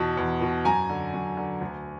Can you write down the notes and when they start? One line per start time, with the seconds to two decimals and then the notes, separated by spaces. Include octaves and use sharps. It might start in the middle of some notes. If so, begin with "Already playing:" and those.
Already playing: E2 B2 A5
0.17 E2
0.41 B2
0.65 F#2 G#5 A#5
0.89 D3
1.14 F#2
1.37 D3
1.61 D2